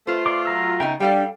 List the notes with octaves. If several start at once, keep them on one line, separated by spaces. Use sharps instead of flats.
A3 F4 B4 C5
D5 C6 D6
F#3 A#5 E6
C#3 B3 D#4 E5 G5 A#5
G3 D4 A4 F5 G5